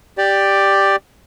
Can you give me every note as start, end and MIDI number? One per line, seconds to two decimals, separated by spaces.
0.18 0.96 67
0.18 0.96 74